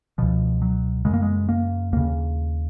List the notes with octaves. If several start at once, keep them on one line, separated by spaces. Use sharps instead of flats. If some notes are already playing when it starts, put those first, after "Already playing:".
C#2 B2 F3
F#3
F#2 C#3 G#3
A#3
G#3
A#3
D#2 C#3 A#3